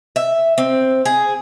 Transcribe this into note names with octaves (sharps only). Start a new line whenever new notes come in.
E5
C4
G#4